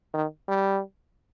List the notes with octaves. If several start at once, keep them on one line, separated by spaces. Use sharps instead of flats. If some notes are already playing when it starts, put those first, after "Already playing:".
D#3
G3